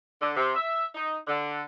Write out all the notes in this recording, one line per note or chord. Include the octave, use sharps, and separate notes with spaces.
D3
C3
E5
D#4
D3